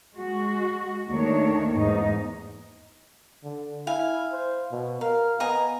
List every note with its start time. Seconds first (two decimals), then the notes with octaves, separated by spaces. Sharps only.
0.14 G#3 F#4
1.09 D#2 D#3 A3 D4 C#5
1.73 E2 G#2 D#4
3.44 D3
3.87 E4 F5 G#5
4.32 C5
4.72 B2
5.01 A#4 F5
5.40 B3 D#5 G#5 A#5